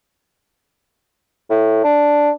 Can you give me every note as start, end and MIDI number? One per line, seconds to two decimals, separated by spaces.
1.50 1.82 45
1.84 2.30 62